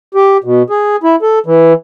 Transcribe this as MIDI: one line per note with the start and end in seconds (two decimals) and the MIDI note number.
0.15 0.37 67
0.44 0.63 47
0.70 0.96 68
1.04 1.16 64
1.22 1.39 69
1.46 1.73 52